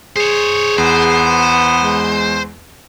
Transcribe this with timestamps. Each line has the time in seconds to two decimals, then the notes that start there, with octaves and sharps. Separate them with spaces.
0.16 G#4 C5 C#5
0.78 E2 B3 C5
1.82 G#3